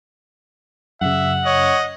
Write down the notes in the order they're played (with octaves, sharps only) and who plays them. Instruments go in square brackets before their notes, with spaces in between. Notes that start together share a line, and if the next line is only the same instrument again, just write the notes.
[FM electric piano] F#2 C#3 [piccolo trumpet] E5 [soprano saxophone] F#5
[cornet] C#5 [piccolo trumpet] D#5